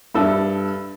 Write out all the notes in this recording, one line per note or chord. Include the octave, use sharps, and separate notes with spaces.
G2 A4 E5